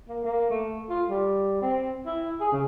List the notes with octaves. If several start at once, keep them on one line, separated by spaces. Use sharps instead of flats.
A#3
A#3
A3
F4
G3
C4
E4
G#4
C#3